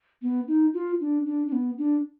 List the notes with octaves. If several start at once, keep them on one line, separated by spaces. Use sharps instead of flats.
B3
D#4
F4
D4
D4
D4
B3
D4